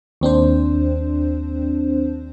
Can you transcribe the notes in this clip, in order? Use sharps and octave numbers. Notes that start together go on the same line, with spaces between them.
D#2 C4 D4 C5